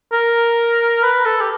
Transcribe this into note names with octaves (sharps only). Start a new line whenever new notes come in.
A#4
B4
A4
G4